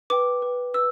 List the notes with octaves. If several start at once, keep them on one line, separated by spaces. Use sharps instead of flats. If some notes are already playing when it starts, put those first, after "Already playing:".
B4 G5 D6
B4 G5
B4 E6